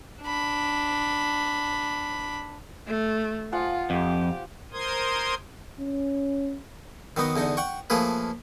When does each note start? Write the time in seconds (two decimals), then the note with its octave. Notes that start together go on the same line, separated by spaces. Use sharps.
0.22 D4 B5
2.87 A3
3.52 F3 F4 F#5 G#5
3.90 F2 G4
4.72 A#4 C5 C6 D#6 G#6
5.80 C#4
7.17 D#3 F#3 B3 D#4
7.36 E2 D3 D#4
7.57 F#5 G5 C#6
7.90 F3 A3 A#3 G#4 B4